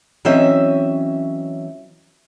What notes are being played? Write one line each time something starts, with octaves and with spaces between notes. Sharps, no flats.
E3 F#3 C4 C#4 D#5 E5